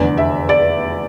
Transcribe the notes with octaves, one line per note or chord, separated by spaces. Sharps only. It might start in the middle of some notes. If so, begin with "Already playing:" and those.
Already playing: F1 E2 D3 D5
E5
D5